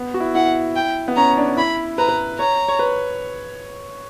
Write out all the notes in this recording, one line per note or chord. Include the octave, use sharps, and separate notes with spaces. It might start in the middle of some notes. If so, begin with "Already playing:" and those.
Already playing: B3
F#4
E4
E4 F#5
G5
B3
C#4 A#5
D4
D4
E4 B5
B4 A#5
B4
C#5 A#5
C#5
B4